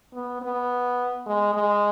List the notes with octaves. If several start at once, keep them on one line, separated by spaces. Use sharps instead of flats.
B3
B3
G#3
G#3